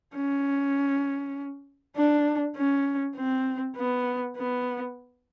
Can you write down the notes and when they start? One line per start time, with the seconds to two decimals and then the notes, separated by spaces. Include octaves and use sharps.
0.15 C#4
1.96 D4
2.56 C#4
3.16 C4
3.77 B3
4.37 B3